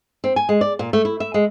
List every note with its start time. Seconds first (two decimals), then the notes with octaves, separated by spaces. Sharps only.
0.24 C4
0.36 G#5
0.49 G#3
0.61 D5
0.79 A#2
0.93 A3
1.05 E4
1.20 E5
1.34 G#3